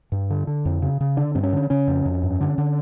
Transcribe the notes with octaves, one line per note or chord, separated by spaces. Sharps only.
G2
D3
D3
F2
C#3
C#3
D3 D4
G2 C4
C#4
D3
C#3 C#4
F2
F2
G2
D3
D3